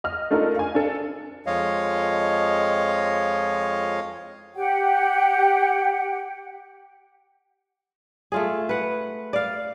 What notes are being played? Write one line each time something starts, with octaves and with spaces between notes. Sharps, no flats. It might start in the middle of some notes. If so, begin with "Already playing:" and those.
D#5 F6
A3 D4 D#4 F4 A4 A#4
F5 G#5
D4 A4
F2 F3 G#3 C#5 D#5 F5
G4 F#5 G5
A3 F4 G#4
B4 F#5
D5 F5